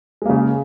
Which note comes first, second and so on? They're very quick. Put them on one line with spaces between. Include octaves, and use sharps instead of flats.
G#3 A#3 C#3